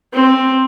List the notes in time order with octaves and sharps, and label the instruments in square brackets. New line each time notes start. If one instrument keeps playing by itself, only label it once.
[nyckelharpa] C4